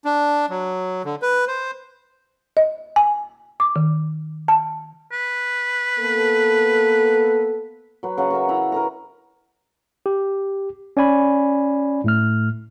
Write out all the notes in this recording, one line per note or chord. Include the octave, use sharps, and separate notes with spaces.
D4
F#3
D3
B4
C5
D#5
G#5
D6
D#3
A5
B4
A#3 B3 A4
F#3 B4
C#3 F#3 F#5 C#6
F#4 A#4 E5
E4 A#5 B5
A#4 B4 A#5
G4
C#4 D5 G#5 B5
A2 A3 F6